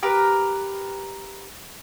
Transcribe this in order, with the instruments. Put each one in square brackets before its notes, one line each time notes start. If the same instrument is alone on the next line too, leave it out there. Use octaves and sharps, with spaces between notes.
[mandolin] G4 A#4 B4